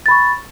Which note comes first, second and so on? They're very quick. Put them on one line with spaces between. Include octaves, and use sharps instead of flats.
A6 B5 C#6